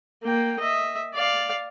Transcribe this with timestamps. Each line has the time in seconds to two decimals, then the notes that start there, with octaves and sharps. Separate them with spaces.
0.23 A#3 G5
0.59 D#5 E5
1.13 D5 F5